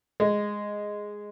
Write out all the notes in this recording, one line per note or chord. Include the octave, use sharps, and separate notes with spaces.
G#3